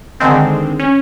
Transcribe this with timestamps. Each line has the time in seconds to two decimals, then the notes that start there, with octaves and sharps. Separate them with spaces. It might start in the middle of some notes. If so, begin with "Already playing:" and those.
0.20 D3 D#3 G#3 C4
0.80 C#4